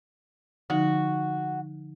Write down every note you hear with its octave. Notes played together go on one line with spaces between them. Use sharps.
D3 F3 D#4 F#4